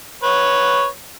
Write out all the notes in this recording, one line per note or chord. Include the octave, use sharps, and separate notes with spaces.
B4 C#5